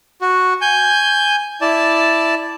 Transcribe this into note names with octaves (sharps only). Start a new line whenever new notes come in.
F#4
G#5 G6
E4 D5 A5